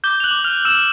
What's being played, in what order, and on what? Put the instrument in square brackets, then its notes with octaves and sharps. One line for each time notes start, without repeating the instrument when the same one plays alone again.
[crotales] D6 G6 G7
F7
F#6 F#7
D6
F6 F7
F6
E6 E7